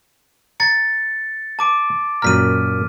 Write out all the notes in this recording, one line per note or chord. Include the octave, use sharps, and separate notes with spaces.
A#5 A6 C#7
A5 D6 D7
F#2 A#2 A#5 F6 B6 D#7